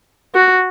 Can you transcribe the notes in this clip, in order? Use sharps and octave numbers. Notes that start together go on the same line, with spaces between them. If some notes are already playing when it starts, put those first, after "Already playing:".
F#4